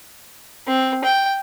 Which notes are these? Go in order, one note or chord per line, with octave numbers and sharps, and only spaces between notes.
C4
G5